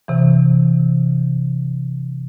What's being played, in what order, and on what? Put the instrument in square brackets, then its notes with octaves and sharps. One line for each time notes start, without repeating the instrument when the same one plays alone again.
[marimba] C3 E3